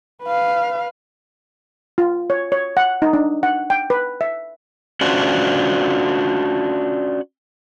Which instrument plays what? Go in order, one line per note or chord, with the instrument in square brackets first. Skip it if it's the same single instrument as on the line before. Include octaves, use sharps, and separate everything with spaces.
[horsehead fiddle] B4 F5
[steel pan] F4
C#5
C#5
F#5
D#4
D4
F#5
G5
B4
E5
[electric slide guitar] C#4 D4 F4 F#4 C5